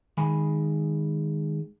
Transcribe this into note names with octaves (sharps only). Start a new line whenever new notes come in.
D#3 G#3 G#5 B5